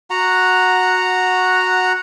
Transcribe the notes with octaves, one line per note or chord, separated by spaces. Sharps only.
F#4 F#5 A#5